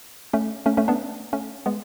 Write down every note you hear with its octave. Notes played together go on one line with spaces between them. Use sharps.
A3 C#4
A3 C#4
A3 C#4
B3 D4
A3 C#4
G#3 B3